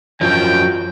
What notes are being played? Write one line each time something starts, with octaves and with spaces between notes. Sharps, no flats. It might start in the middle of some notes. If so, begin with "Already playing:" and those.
F#2 F3 F#3 G5